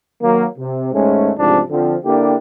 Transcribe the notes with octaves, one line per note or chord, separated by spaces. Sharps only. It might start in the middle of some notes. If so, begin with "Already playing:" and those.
D#3 F#3 A#3
C3
D#2 G#2 G#3 A3 C#4
A1 G#2 C3 F3 C4 D4
D3 F3 C4
D3 A#3 D4 E4 G4